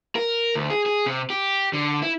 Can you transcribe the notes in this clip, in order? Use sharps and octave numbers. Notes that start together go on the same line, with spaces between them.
A#4
D2
G#4
G#4
C3
G4
D3
E4